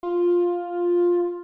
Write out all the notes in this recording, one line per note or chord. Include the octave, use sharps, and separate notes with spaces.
F4